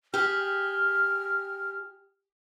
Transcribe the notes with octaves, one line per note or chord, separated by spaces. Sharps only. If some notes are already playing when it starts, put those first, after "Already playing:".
G4 G#4 F6